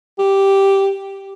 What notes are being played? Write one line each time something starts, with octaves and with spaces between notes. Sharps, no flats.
G4